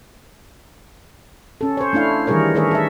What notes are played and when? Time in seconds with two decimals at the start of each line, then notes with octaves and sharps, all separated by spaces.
1.61 C#4 A4
1.77 C5 C#5
1.93 A3 D4 E4 F5
2.27 D#3 E3 G3 G#4 A#4 C#5
2.54 D#3 A3 G#4 A#4 C#5 E5
2.71 A4 E5